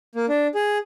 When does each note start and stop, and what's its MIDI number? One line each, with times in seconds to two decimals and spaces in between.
0.15 0.26 58
0.29 0.47 62
0.55 0.78 68